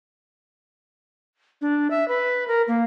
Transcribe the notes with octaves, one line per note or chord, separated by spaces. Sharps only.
D4
E5
B4
A#4
A#3